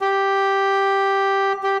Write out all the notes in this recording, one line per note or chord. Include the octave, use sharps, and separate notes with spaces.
G4
G4